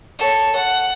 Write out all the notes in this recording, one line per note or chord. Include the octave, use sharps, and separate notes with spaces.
A4 C#5
F#5